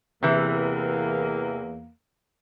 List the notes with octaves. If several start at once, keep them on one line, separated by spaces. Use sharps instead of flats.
E2 C3 E3 A#3